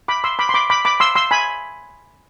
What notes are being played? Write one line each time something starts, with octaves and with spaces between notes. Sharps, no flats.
B5 D6
C6 E6
B5 D6
C6
B5 D6
B5 D6
B5 D6
C6 E6
C6 E6
G#5 B5